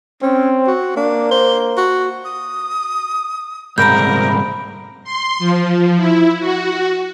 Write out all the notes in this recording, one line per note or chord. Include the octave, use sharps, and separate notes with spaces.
C4 C#4
F#4
A#3 D4
C5
F#4
D#6
C2 G#2 A#4 A#5 B5 G6
C6
F3
E4
F#4